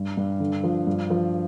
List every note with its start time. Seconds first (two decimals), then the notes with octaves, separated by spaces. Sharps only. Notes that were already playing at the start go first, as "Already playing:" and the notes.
Already playing: G2
0.17 G2
0.40 D3
0.64 F3
0.87 G2
1.10 F3